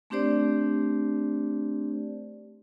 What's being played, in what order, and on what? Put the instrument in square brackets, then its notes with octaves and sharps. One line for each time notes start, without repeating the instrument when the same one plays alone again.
[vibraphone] A3 C4 D4 G4 C5 D5